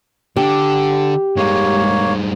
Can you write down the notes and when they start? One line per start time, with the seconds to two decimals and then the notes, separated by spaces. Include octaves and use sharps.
0.36 D3 G4
1.37 G2 G#3 A#3 C#5